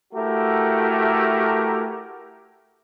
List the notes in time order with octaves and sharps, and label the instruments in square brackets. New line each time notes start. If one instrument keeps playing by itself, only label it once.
[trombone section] A3 E4 F#4 G4 A4 A#4